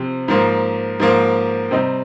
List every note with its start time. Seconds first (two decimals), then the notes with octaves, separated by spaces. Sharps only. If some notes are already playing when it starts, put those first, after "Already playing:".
Already playing: C3 F3 C4
0.28 G#2 F3 A#3
1.00 G#2 F3 A#3
1.71 C3 G3 C4 D#4